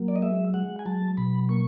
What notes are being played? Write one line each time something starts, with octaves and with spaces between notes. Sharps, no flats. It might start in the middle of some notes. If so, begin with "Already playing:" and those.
Already playing: F#3 A#3
D5
D#5
G#3 E5
G#3 F#5
G#5
F#3 A5
B2 B5
A#3 C#6